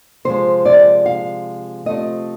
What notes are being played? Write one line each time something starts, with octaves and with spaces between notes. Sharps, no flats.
C3 F3 G#3 C5
D5
F5
C3 F3 A3 C4 D#5